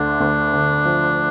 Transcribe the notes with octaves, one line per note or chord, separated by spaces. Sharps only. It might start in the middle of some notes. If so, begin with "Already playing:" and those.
Already playing: D2 D3 D4
D2
D3
F3